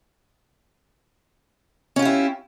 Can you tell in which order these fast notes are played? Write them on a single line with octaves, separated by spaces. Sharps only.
C#4 F4 G4 E4